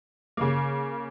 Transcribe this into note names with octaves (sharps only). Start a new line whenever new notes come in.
C#3 A#3